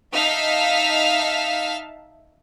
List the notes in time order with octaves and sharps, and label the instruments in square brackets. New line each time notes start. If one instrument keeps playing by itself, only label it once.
[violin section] D#4 E5 F5 A5 F6 B6